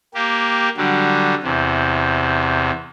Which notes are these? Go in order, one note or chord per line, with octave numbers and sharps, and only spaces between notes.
A#3 G4
D3 F#3 G3
E2 C3